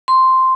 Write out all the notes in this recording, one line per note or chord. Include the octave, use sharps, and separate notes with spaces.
C6